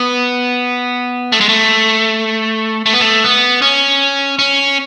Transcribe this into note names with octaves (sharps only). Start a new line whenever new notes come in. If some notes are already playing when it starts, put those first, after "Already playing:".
Already playing: B3
A3
G#3
A3
A3
B3
A3
B3
C#4
C#4